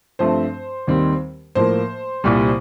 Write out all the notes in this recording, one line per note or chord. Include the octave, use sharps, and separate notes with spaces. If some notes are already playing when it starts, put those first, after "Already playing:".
G2 F3 A3 C4 C5
D#2 D#3 G3 C4
A2 F3 A#3 C5
C2 A#2 G3